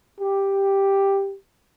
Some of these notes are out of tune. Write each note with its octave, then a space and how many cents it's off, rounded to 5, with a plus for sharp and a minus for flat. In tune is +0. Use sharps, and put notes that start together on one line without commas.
G4 +5